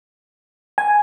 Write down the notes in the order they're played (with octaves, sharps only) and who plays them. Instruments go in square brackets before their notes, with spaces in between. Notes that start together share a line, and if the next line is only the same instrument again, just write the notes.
[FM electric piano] G#5